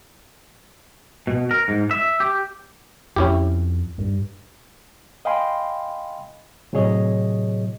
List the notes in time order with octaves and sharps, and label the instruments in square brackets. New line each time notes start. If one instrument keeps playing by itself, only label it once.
[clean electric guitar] B2
A#4
G#2
E5
G4
[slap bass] F2 [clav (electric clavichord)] C#4 E4 G4
[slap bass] G2
[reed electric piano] D#5 F5 G5 G#5 B5 C6
A2 C3 F#3 G#4 C#5 D#5